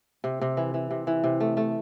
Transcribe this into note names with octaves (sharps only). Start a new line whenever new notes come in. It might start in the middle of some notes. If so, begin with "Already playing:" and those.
C3
C3
E3
E3
C3
E3
C3
A3
A3